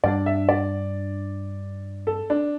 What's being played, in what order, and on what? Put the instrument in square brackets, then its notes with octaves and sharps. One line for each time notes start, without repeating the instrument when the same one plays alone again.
[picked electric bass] G2 G3 D4 [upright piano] D5
[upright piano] E5
D5
A4
D4